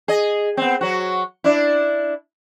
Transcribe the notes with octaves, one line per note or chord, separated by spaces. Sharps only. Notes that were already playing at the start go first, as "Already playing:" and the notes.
G#4 D#5
B3 C4
F#3 F#4
D4 E4